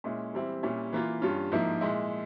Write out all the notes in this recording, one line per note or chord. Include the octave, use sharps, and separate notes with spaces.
A#2 G#3 C#4 E4
E3 G3 C4 E4
A#2 G3 C#4 E4
E3 A#3 F4
G2 G3 C#4 F4
G#2 F3 A#3 E4
A#2 G#3 E4